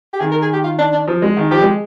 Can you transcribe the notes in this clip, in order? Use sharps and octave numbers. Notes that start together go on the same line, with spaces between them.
G4
D#3 G#4
A#4
G#4
G4
F4
D4
D4
F3
G#3
D#3
F3 G4
G#3